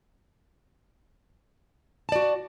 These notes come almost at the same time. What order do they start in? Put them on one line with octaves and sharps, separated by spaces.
A5 D5 F#4